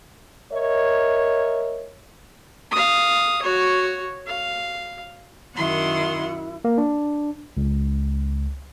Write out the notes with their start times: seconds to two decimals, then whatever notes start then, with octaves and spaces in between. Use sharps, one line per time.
0.53 A#4 C#5 D#5 E5
2.71 F5 D#6
3.42 F#4 C#5
4.27 F5
5.57 F#2 D#3 E4 F#5 C6
6.65 A#3
6.78 D4
7.57 C#2